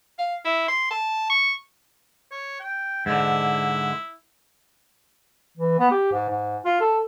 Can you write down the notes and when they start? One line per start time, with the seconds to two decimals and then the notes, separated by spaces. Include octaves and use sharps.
0.19 F5
0.45 E4
0.68 C6
0.90 A5
1.30 C#6
2.32 C#5
2.60 G5
3.06 G#2 D3 E4
5.57 E3
5.79 B3
5.91 G4
6.12 G#2
6.29 G#2
6.65 F4
6.81 A4